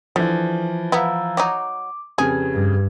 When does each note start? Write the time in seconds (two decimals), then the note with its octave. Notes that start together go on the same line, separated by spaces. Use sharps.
0.16 D3 E3 F3
0.92 B3 E4 F5 A#5 E6
1.37 F#3 D#4 D6
2.18 F2 C#3 G4 G#4 B4 G#6
2.53 G2